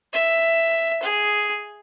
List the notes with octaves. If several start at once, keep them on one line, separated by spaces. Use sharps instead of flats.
E5
G#4